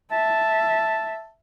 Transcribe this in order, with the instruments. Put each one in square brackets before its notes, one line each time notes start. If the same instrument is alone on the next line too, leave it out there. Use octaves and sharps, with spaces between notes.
[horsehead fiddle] E5 [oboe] A5